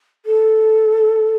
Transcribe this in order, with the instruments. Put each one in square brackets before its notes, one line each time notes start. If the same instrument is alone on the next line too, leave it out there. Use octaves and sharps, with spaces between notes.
[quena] A4